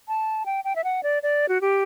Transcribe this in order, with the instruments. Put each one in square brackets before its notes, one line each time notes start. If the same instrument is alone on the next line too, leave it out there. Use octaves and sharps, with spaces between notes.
[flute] A5
G5
G5
E5
F#5
D5
D5
F#4
G4